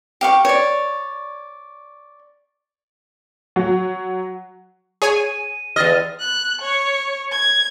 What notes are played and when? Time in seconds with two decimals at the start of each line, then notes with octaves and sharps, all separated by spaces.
0.21 G4 F5 C#6
0.45 C#5 D5
3.56 F#3
5.02 G#4 C#5 G#5
5.16 D#7
5.76 E2 D#5 F6 A6
6.19 F#6
6.60 C#5
7.32 G#6